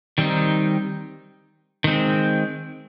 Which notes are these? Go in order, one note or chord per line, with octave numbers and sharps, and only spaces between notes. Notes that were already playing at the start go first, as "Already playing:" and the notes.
D#3 G3 C4 D#4
D#3 G#3 C4